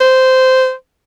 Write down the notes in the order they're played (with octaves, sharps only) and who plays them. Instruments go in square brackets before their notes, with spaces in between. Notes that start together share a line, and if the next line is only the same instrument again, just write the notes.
[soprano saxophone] C5